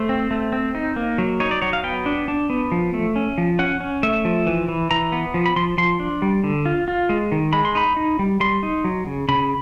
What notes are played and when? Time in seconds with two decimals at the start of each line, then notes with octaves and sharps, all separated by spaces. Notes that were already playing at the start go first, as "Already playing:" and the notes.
Already playing: A3 C5
0.09 C4
0.31 A3
0.53 C4
0.75 D#4
0.96 A#3
1.18 F#3
1.40 D#4 C#5
1.51 D5
1.62 F#3 C#5
1.73 F5
1.84 B3 G5
2.06 D4
2.28 D4
2.50 B3
2.72 F3
2.94 A3
3.16 C#4
3.38 F3
3.59 C#4 F#5
3.80 C#4
4.03 A3 E5
4.25 F3
4.47 E3
4.68 E3
4.91 E3 A#5
5.12 B3
5.34 F3
5.46 B5
5.56 F3 C6
5.78 F3 C6
6.00 D4
6.22 G3
6.44 D3
6.66 F4
6.88 F4
7.09 G#3
7.32 D#3
7.53 G#3 B5
7.65 C6
7.75 D#4 B5
7.97 D#4
8.19 G3
8.40 G3 C6
8.63 D#4
8.84 F#3
9.06 C#3
9.29 C#3 B5